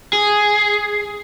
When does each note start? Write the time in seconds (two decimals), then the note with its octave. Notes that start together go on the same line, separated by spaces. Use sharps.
0.13 G#4